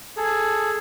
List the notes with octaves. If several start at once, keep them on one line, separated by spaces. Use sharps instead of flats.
G#4 A4